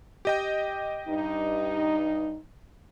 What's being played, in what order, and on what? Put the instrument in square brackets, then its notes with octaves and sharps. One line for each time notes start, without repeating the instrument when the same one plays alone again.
[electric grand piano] G4 D#5 G5
[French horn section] G2 D#4